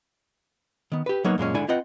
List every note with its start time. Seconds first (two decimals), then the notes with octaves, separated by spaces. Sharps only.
0.92 D#3 B3
1.06 G4 B4
1.24 F#3 A#3 B3 D#4 A#4 C#5
1.38 F#2 A#2 G#3 C#4
1.54 G#2 D3 E4 D5 G#5
1.68 C4 F4 B4 D#5 F#5 G5